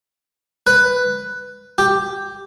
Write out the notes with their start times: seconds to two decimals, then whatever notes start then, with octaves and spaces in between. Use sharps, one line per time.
0.67 B4
1.78 G4